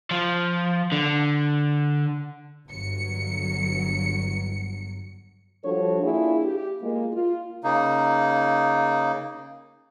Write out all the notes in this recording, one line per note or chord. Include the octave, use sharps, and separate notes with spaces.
F3
D3
G1 F#3 C#7
F3 G3 D4 F#4 A4 C#5
A#3 D4 E4 F4 G#4
G4
G#3 A#3 F4
F4
C#3 A#3 D#4